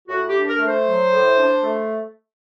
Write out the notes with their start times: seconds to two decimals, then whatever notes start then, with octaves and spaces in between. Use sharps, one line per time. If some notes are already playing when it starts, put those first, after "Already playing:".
0.08 A2 F#4
0.28 G4
0.35 D4
0.47 A#4
0.60 A3
0.67 C5
0.86 F#3
1.12 A2
1.37 D4
1.63 A3